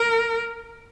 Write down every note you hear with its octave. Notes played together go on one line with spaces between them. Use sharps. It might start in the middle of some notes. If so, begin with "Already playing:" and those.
Already playing: A#4